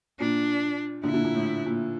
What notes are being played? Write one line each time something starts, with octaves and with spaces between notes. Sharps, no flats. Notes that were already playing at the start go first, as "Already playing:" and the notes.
A#2 D4
A#2 D3 E4
A#2 D3
A#2
A2
A#2